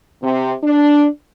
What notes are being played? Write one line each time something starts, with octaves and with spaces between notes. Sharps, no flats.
C3
D4